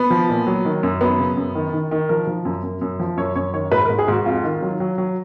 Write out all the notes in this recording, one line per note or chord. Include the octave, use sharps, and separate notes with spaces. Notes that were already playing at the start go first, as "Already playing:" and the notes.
Already playing: B3
F3
A#2
F#3
D#3
F#2
F#3 B3
C#3
F#2
D#3
D#3
D#3
F3 A#4
F3
F#2
F#2
F#2
F3
F#2 C#5
F#2 C#5
D#3 C#5
G#2 B4
A#4
G#2
G#4
G#2 F#4
F2 F4
D#3
F#3
F#3
F#3